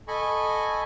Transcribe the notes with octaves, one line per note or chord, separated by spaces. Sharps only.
A4 D#5 G#5 B5 C#6